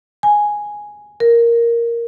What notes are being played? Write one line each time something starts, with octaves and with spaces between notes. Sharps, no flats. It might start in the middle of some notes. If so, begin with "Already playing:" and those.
G#5
A#4